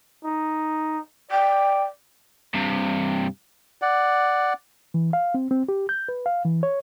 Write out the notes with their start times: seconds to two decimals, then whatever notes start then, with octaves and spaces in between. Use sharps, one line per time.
0.24 D#4
1.31 D5 G5
2.54 G2 C3
3.82 D5 F#5
4.94 E3
5.13 F5
5.34 C4
5.51 C4
5.69 G4
5.89 G6
6.09 B4
6.26 F5
6.45 E3
6.63 C#5